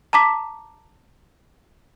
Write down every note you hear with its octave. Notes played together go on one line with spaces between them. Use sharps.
A5 A#5 D6 B6